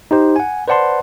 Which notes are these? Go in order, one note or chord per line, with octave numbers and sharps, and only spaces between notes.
D#4 G4 C5
F#5 G#5
B4 C5 D5 F#5 A5 C6